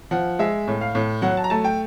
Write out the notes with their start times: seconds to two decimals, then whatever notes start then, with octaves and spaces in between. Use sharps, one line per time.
0.11 F3 F#5
0.39 G#3 E5
0.68 A2
0.81 F5
0.95 A2
1.22 F#3 F#5
1.37 A5
1.44 A#5
1.50 A3 A5
1.64 G5